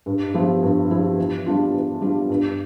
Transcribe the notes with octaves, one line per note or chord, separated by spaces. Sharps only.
G2
F3 B3 E4 G4
G2
F3 B3 E4 G4
E3
G3 B3 D4 F4
E3
G3 B3 D4 F4
G2